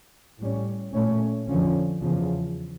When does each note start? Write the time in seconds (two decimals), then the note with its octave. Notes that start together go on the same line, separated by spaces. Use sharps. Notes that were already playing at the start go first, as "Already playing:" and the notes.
0.39 A2 G3 C#4
0.92 A#2 A3 C#4
1.48 F2 D3 F3 C#4
2.01 E2 C#3 F3